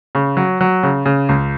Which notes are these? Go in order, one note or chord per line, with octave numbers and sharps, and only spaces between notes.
C#3
F#3
F#3
C#3
C#3
C#2